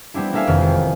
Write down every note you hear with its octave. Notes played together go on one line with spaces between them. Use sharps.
G3 B3 C4 D4 E4
A#3 D4 A4 E5 F5 G#5
F1 F2 D#3 B4 F6
D#3 G#3
A1